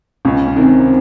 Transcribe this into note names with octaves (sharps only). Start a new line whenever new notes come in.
C#2 C#4
C#4
C3 D#3 C4